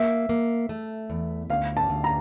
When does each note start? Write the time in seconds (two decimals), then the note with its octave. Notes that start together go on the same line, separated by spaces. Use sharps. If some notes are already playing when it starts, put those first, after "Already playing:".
Already playing: A#3 E5
0.29 A#3
0.69 A3
1.10 E2
1.50 D2 F5
1.77 A5
1.90 D2
2.04 A#5